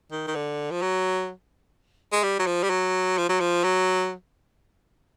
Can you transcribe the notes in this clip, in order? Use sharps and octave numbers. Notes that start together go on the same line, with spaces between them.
D#3
D#3
D3
F3
F#3
G#3
G3
F#3
F3
G3
F#3
F3
F#3
F3
F#3